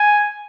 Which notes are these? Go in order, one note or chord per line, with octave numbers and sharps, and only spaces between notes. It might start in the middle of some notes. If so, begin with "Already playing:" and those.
Already playing: G#5